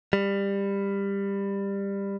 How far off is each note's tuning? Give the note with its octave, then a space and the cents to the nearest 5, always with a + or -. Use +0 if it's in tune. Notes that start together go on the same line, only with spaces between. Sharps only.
G3 +20